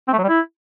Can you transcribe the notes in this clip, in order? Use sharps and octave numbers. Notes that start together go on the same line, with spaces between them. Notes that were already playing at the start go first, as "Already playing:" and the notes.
C4
A3
F#3
G3
E4